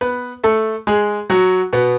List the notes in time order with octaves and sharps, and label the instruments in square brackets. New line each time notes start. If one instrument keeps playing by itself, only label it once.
[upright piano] B3 B4
A3 A4
G#3 G#4
F#3 F#4
B2 B3